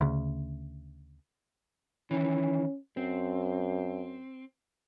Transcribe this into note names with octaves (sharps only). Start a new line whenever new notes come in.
D2 C#3
D#3 E3 C#4
F#2 C4